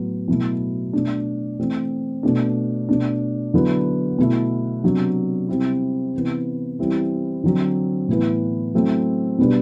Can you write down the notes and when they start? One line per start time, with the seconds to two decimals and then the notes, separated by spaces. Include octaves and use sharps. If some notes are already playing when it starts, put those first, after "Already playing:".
Already playing: A2 F#3 B3
0.28 B2 F#3 A3 E4
0.93 B2 A3 D4
1.59 E3 A3 C4
2.23 B2 A3 D4
2.89 B2 A3 D4
3.54 D3 F#3 B3 E4
4.19 B2 A3 E4
4.83 C3 F#3 B3 D4
5.48 C3 G3 C4 E4
6.14 C3 E3 B3
6.79 E3 G3 C4 E4
7.44 D3 F#3 C4
8.08 A2 E3 B3
8.75 F#3 A3 C4 E4
9.38 B2 G3 B3 D4